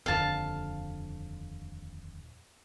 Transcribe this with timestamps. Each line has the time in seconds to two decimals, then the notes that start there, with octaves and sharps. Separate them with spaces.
0.06 D#1 F2 D3 F5 A5